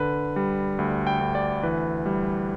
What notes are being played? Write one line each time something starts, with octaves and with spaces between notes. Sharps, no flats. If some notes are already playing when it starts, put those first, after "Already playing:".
Already playing: D3 B4
G3
D2
G5
D2
D5
E3 B4
G3